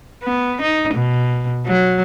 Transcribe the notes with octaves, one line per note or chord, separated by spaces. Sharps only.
B3
D#4
B2
F#3